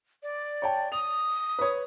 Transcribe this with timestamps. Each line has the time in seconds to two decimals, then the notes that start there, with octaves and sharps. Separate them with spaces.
0.23 D5
0.62 C#5 G5 A5
0.92 D#6 F7
1.59 B4 C#5